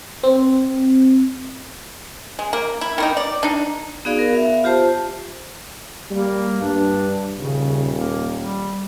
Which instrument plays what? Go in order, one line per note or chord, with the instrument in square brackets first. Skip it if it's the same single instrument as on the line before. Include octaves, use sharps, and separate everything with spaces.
[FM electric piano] C4
[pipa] G#3
A#3
E4
D#3 A#3 D#4
D5
D4 D#4
[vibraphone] B3 D#4 F#4 G#4 D5 F5
A#4
B3 E5 F5
F4 G4 C5 A5
[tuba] G3 [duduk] A#3
[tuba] G2 [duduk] D4
[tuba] D#1 [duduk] C#3
[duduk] A#3
G3